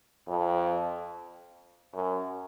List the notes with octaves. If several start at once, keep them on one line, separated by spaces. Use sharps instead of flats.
F2
F#2